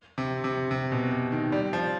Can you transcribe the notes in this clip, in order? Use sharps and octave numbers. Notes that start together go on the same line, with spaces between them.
C3
C3
C3
B2
C3
D#3
G3
F3